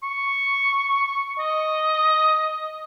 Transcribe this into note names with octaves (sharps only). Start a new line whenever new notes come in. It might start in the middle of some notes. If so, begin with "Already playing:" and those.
C#6
D#5